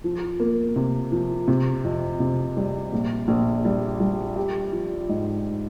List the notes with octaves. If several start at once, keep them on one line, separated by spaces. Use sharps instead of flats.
F3
A#3
C3
F3
C3
F2
C3
G3
A#1
A#1
G3
G3
G4
F3
G#2